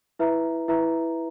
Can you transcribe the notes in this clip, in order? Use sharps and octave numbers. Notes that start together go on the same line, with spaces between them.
E4 B4 E5 A#5
E4 B4 E5 A#5